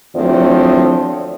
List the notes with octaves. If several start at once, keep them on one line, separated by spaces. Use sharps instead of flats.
E2 D3 F3 F#3 A3 C4